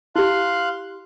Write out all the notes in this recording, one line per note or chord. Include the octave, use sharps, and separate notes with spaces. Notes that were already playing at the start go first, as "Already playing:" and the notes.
E4 G4 F5 C6 F#6